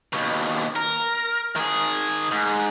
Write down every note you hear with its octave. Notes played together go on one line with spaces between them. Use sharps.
D#2 B2
A#4
D#3 G#4
G#2